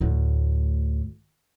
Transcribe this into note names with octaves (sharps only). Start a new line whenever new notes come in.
D2 A2